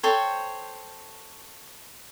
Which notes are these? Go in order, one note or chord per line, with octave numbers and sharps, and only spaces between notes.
A4 C5 C#5 G5